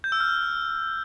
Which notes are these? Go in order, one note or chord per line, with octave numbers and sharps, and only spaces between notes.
G6
E6
F6